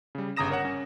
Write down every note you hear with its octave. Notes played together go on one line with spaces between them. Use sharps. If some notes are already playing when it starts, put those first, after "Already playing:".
C#3 G3
G1 C#3 A#5 D#6 A#6 E7
A#4 C#5 F#5
C#4